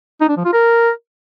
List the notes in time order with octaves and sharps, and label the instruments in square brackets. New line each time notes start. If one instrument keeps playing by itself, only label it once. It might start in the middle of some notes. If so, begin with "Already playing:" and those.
[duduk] D#4
D4
F3
F4
A#4